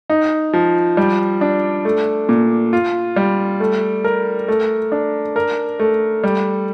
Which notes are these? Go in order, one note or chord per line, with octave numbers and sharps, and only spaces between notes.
D#4
F3
G3
D4
A3
A#2
F4
G3
A3
A#4
A3
D4
A#4
A3
G3